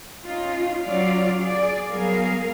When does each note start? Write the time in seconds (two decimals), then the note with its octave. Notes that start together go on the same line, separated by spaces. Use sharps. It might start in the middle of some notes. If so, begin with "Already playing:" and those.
0.25 C#4 D#4 F4
0.85 F#3 C#4 F4 D5 F5
1.42 G#4 D5
1.90 F#3 G3 B3 G#4 A#4 F5